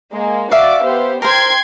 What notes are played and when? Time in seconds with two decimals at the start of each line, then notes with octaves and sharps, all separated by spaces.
0.12 G#3 A#3
0.51 F#4 D5 E5 F5 D6
0.82 B3 G4 C5
1.22 A#4 C5 G5 C6 G#6